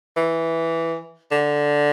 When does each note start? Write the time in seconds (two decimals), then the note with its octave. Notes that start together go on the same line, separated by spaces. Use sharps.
0.16 E3
1.32 D3